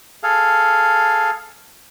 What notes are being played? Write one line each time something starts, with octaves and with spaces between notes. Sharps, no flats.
G#4 A4 F5